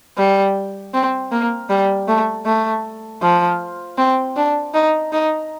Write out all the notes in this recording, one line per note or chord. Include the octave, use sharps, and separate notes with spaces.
G3
C4
A#3
G3
A3
A3
F3
C4
D4
D#4
D#4